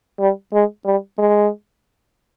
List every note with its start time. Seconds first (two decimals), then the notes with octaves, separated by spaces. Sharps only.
0.20 G3
0.53 G#3
0.85 G3
1.18 G#3